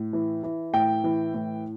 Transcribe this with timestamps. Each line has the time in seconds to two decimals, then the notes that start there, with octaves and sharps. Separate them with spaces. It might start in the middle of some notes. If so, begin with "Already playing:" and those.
Already playing: A2
0.13 E3
0.43 E3
0.73 A2 G5
1.04 E3
1.34 A2